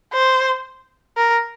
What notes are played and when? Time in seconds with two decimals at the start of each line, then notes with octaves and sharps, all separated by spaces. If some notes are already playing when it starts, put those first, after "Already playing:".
0.13 C5
1.17 A#4